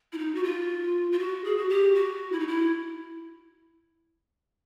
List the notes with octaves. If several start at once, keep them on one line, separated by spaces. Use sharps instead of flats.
E4
D#4
F#4
F4
F4
F#4
G#4
F#4
G4
F#4
E4
D#4
E4